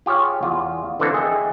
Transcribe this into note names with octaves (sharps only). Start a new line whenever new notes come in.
F4 G4 G#4 C#5 F5
E2 F4
D3 E3 A#3 C4 D4 A4
G#4 D#5 E5 G5